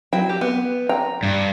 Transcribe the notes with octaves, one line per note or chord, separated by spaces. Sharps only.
F#3 E4 G5
G4
B3
G5 A#5
G2